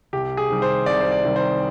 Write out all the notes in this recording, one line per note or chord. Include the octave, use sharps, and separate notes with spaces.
C2 G4
G#4
C3 D#3 G3
C5
C2 D5
C5
D5
C3 D#3 G3
C5